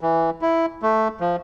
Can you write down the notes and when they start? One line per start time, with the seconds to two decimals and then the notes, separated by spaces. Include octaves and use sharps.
0.01 E3
0.42 E4
0.82 A3
1.20 F3